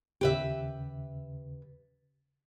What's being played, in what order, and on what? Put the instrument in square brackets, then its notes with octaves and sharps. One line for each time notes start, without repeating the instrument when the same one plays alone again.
[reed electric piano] D#2 C#3 [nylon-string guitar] G4 B4 E5